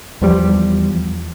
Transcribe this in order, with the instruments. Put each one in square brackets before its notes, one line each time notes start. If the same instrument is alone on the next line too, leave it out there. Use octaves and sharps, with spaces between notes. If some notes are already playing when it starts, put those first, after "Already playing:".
[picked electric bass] E2 F3 G3